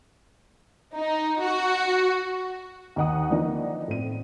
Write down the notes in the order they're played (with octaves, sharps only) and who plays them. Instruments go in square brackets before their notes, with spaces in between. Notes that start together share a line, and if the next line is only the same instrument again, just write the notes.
[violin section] D#4
F#4
[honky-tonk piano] D#2 D#5 F#5 D#6
E3 F3 A#3 D4 D#4
A2 C4 D#7